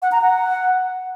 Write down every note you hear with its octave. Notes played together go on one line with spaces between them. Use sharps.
F#5
A#5
F#5